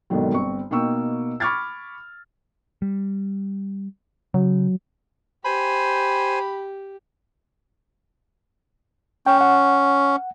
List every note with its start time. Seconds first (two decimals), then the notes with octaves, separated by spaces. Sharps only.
0.10 G#1 B2 D3 D#3 F#3
0.32 G1 C4 C#6
0.71 B2 A#3 D#4 G5 C#6 E6
1.40 B5 C#6 D6 F6 G#6 A6
2.82 G3
4.34 C#3 F#3
5.45 G4 C5 G#5 B5
9.26 C#4 G5
9.41 F#5